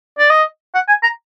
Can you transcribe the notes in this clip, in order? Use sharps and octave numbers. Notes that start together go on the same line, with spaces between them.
D5
D#5
F#5
G#5
A#5